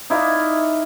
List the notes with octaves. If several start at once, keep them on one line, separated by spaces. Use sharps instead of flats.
D#4 E4 D5 F5